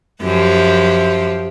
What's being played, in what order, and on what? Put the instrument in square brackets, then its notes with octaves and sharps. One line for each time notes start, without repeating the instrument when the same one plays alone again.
[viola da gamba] F#2 F3 G4